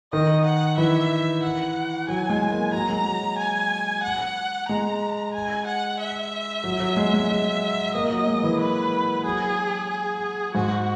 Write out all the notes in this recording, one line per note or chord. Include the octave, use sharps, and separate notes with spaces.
D#3 D#5
F#5
E3 E5
F#5
F#3 G#5
G#3
A#3
F#3 A#5
G#3
F#3
G#5
F#5
G#3 A#5
G#5
F#5
E5
F#3
F#3
G#3
G#3
G#3
A#3 D#5
F#3
G#3
E3
B4
F#3 G#4
G#4
G#2 F#4